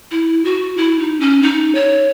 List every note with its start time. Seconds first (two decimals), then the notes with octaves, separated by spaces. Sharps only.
0.11 E4
0.45 F#4
0.77 E4
0.99 D#4
1.20 C#4
1.42 D#4
1.75 C#5